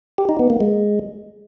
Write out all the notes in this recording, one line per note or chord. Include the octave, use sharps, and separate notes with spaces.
G4
D#4
B3
A#3
G#3